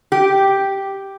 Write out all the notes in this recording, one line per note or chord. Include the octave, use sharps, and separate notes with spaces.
G4